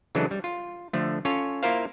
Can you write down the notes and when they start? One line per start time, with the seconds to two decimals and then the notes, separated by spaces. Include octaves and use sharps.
0.15 C#3 E3 F#3 G#3 D4 A4
0.31 G3
0.44 F4
0.93 D3 F3 A3
1.25 C#4 F4 A4 C#5
1.63 A#3 E4 F4 A#4 C5 F5